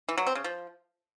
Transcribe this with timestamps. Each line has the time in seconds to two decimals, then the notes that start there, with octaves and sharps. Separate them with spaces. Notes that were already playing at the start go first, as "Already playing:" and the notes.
0.09 E3
0.18 F#3
0.26 C4
0.35 C#3
0.44 F3